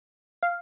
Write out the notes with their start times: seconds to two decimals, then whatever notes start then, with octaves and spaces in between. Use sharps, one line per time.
0.43 F5